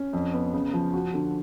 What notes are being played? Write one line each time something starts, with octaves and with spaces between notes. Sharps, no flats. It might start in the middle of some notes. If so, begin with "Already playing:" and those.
Already playing: C#4
F2
B3
C#3
F3
F#4
D3